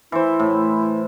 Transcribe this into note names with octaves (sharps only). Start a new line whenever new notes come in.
E3 E4 C5
A2